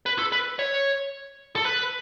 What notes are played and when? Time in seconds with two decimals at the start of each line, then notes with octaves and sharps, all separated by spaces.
0.06 B4
0.19 A4
0.32 B4
0.59 C#5
1.56 A4
1.65 B4